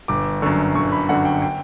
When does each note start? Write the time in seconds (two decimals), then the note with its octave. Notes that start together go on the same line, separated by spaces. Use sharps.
0.08 G1 D6
0.42 F#2 D3 C#6
0.75 G1 C#6
0.92 B5
1.09 F#2 D3 F#5
1.25 G5
1.42 G5